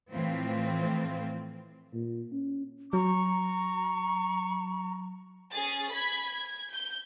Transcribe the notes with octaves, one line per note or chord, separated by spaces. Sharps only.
A2 E3 F3 C4 F4
A#2
C#4
F#3 A#5 C#6
C#4 G#4 A6
B5 G#6 B6
G#6
G6